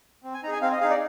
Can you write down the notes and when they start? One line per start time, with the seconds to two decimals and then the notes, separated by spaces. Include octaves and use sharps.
0.24 C4
0.34 G#5
0.43 D#4 A#5
0.48 G#4 G#5
0.62 C4 F5
0.72 D#5
0.81 D#4 G#4 F5
0.90 D5